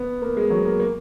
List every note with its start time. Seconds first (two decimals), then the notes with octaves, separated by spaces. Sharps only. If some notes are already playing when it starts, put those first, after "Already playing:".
Already playing: B3
0.22 A#3
0.37 G#3
0.50 F#3
0.65 A#3
0.80 A#3